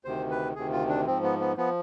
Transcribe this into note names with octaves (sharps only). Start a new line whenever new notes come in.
D2 C3 D#3 C5
B4
D2 C3 D#3 G#4
F4
D4
G#2 F3 C4
B3
B3
F3 B3